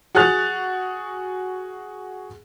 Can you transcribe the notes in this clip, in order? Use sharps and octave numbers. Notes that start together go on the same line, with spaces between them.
F#4 G#4 F#5 F#6 A6 F7